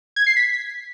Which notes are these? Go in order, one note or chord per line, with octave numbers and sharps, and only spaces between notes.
G#6
C7
B6